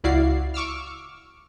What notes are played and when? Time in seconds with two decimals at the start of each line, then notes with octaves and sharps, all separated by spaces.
0.04 C#2 E4 F#4 D5 F5 C7
0.54 C#6 D6 E6 F6